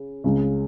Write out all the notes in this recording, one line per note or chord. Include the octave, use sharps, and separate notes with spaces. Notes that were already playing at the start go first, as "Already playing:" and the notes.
Already playing: C#3
C#2 C#3